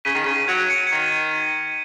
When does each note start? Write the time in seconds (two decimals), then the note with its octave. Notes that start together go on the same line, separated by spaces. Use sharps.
0.05 C#3 B6 D#7
0.14 D#3
0.25 C#3
0.48 F#3 G#6 C#7
0.70 C#7
0.78 D#7
0.87 D#3 G#6 C#7